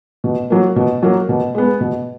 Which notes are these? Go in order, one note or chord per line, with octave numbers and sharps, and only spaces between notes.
B2
F#3 A#3
B2
F#3 A#3
B2
G#3 B3
B2